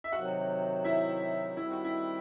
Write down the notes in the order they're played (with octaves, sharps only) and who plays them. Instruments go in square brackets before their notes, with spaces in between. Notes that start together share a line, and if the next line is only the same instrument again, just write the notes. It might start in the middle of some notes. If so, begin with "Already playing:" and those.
[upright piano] E5
[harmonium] C3 D#3 F#3 [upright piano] F#4 F#5
[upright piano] E4 E5
[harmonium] D#3 G3 C4 [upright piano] E4
[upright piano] F#4
E4